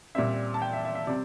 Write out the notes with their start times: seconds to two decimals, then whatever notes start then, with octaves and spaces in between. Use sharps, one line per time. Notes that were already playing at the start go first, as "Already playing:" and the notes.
0.15 A#2 G3 C4 E5
0.54 A5
0.62 G5
0.73 E5
0.85 E5
0.95 E5
1.07 C3 G3 C4 D5